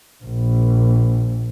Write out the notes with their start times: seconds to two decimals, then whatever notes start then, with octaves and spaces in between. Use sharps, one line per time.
0.24 A#1